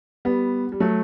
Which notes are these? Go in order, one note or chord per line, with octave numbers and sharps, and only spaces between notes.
G3 B3
G3
F#3 A3